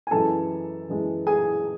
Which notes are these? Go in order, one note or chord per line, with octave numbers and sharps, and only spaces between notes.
G#5
F#2 E3 G#3 A4 A5
F#2 E3 G#3
G#4 G#5